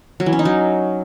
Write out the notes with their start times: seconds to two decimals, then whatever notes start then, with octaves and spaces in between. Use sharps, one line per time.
0.20 F#3
0.26 E3
0.33 C#4
0.39 D#4
0.45 F#3